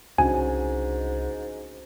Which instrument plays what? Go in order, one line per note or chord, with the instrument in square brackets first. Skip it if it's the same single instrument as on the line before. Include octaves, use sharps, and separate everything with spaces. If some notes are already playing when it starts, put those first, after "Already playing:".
[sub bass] C2 [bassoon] G#2 [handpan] C#4 D4 F#4 [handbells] G#5